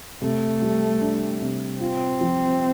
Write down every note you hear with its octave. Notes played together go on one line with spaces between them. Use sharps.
C3 A3
G3
D4
C3
C4 F4
F3